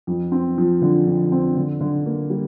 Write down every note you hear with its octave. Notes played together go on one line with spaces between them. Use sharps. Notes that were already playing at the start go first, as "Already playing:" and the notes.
F2
C4
F3
D3
F2
C4
D3
D3
A#3
G3